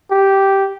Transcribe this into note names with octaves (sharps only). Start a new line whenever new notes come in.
G4